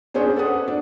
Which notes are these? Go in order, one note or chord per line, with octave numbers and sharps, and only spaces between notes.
C#4 D4 G#4 C5 C#5
A4 B4 F#5 D#6
D4